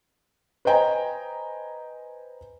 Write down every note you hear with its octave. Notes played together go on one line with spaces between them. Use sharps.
B4 C5 D#5 G5 G#5 A#5